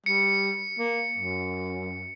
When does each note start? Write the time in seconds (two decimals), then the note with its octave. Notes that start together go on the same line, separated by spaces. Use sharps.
0.06 G3 C#7
0.78 A#3
1.18 F#2